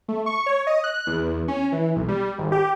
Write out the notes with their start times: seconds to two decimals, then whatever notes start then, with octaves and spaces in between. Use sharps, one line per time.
0.08 A3
0.26 C#6
0.46 C#5
0.67 D#5
0.84 F#6
1.07 E2
1.48 C#4
1.72 E3
1.96 B1
2.08 G3
2.38 G#1
2.52 G4